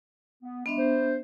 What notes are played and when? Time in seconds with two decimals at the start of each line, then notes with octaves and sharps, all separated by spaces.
0.43 B3
0.66 G#3 B3 D4 E5
0.78 C5